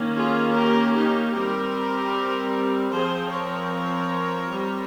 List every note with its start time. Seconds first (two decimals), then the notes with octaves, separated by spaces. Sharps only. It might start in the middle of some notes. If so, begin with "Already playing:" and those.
Already playing: D#3 A#3 C#4
0.17 F4 G#4
0.56 G4 A#4
0.95 D#4 G4
1.34 G3 C4 G4 A#4
2.92 F3 C4 G#4 C5
3.31 A#4 C#5
4.49 G3 C4